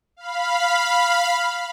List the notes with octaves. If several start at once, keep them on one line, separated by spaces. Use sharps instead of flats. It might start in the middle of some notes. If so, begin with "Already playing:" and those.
F5 B5